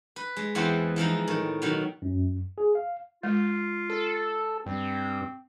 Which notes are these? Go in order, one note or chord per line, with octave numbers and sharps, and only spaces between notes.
B4
G#3
E2 E3 B3 C4 C5 F#5
E3 F3 G#3 D#4
A2 D#3
B2 D#3 F#3
F#2
G#4
F5
G#3 F4
A4
G2 C4